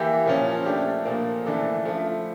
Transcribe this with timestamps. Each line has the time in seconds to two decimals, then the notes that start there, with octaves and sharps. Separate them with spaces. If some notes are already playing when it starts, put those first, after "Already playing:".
Already playing: E3 A#3 E4 G4
0.26 A#2 F3 C#4
0.65 A3 D4 G4
1.05 A#2 F3 A#3
1.45 C#3 E3 A3 D4 A4
1.85 F3 A3 E4